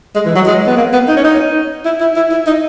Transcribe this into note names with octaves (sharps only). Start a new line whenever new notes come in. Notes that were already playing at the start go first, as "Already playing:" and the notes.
G#3
E3
F#3
G#3
B3
A#3
B3
D#4
C#4
D#4
E4
E4
E4
E4
D#4